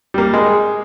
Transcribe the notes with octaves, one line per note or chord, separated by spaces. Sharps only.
G3 A#3
G#3